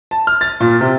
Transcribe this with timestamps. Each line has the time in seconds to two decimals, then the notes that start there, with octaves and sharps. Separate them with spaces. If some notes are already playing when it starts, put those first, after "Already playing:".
0.11 A5
0.27 F6
0.41 A6
0.60 A#2
0.81 C3